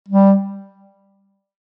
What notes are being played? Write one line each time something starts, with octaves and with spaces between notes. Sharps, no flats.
G3